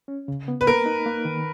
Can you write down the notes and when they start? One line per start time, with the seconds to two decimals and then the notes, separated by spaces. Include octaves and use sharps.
0.08 C#4
0.28 C#3
0.48 B3
0.61 B4
0.67 A#3 A#4
0.86 D#4
1.06 A#3
1.25 D#3